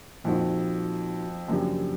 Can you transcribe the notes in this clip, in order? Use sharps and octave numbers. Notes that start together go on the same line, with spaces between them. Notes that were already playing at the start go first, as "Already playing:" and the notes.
F2 A#2 G3 A#3 D#4 F#4
F#2 C#3 F3 A#3 D4 G4